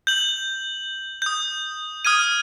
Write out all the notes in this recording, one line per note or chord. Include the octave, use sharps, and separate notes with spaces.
G6 F#7
D#6 G6
D#6 F6 G#6 D#7